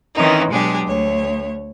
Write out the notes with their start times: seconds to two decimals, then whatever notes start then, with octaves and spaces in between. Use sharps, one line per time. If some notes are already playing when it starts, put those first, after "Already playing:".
0.15 D#3 E3 C4 C#4 D#4
0.52 B2 F#3 G#3 D4 G4 G#4
0.88 D2 C#5